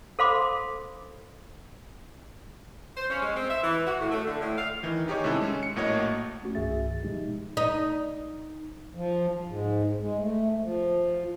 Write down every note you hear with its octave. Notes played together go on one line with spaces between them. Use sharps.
A4 C5 F5 B5 C6 D6
C5
C#4
G#3
C4
E5
E3
F#4
A2
A3
D3
A2
F5
D#3 E3
D#3 D#4 G4 G#4 C#5
C3 G#3 C4 C#4 E4 A4
G#3 C#4
C#7
A#1 A2 A#3 F#4 C#5 D#5
A3 C#4 F#4
C2 G2 D#3 G#4 E5 A6
B2 F3 G#3 D#4 G4
D#4
F3
G#2
G#3
A3
F3